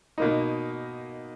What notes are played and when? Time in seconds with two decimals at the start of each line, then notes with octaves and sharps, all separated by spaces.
0.18 B2 A#3 D#4